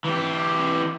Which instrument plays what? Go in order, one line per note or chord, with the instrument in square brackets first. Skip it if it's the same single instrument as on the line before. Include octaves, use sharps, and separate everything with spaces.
[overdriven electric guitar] E3 G4